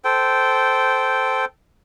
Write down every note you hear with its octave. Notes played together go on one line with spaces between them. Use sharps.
A4 C5 G5